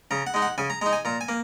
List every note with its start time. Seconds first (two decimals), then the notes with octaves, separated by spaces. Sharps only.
0.11 C#3 A#5
0.27 F#5
0.34 G#3 D#4
0.42 F#5
0.58 C#3 G#5
0.70 A#5
0.81 G#3 D#4 A#5
0.93 G#5
1.05 A#2 A#5
1.21 G#5
1.29 A#3